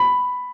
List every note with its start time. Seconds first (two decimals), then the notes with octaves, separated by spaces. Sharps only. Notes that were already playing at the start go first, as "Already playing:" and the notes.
Already playing: B5